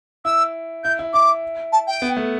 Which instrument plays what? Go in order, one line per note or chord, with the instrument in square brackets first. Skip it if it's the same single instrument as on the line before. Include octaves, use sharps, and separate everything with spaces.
[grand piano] E4 [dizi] E6
[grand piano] E4 [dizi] G6
[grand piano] E4
[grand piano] E4 [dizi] D6
[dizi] A5
G5
[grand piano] B3
A3